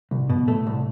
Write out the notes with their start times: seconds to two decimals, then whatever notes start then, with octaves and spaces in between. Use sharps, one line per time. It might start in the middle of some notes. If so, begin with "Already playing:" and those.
0.11 C2 B2
0.20 A2
0.28 G2 B2
0.35 A2
0.47 A2 A3
0.67 C2